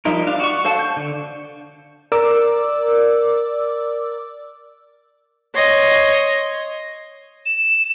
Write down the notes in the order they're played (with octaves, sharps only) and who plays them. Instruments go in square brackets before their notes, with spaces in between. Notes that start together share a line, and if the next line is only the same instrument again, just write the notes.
[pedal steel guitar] F3 G3 D#4 E4 A#4
D4 F5
F#4 C#6
A4 C5 F5 A5
G6
D3
[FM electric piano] A#4 D5 D6 E6
[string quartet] C#5 D#5 C6
[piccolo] E7